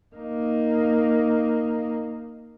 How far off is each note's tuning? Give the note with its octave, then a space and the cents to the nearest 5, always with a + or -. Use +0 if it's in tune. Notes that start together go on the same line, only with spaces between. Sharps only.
A#3 +0 D#4 +0